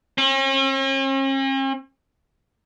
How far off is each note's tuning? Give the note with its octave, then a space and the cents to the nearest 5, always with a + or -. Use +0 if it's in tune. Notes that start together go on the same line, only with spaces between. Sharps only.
C#4 -45